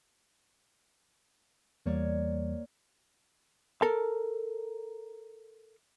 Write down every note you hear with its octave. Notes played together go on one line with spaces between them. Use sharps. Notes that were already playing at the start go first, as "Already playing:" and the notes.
E2 E3 G3 A#3 C#5 D5
A4 A#4 A5